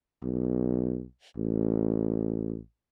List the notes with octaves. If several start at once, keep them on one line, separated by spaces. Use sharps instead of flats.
B1
A1